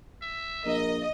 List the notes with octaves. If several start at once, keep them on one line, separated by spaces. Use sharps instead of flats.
E5
A#1 A#4 D#5